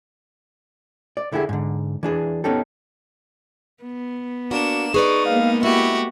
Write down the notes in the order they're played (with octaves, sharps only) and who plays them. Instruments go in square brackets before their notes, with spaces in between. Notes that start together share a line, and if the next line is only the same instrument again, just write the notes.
[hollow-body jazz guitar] D5
D3 E4 G4 G#4
G#2 D3
E3 D4 G#4
B3 C#4 D#4 G4 A4
[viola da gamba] B3
[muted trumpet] A#3 [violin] D4 E7 [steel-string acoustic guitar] F#4
[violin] D#4 [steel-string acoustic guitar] G#4 B4 D5 [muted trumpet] C#6
[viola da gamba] G#3 A#3 B3 [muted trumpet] F5
[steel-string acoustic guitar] A3 [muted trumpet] E4 [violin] F#4 G4